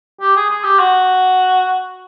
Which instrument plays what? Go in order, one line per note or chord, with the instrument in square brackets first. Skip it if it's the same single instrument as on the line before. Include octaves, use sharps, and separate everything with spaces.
[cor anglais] G4
G#4
G#4
G4
F#4